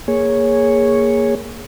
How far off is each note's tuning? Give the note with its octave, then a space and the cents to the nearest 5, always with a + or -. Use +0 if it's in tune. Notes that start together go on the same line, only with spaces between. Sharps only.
A#3 +0 G#4 -5 C#5 +0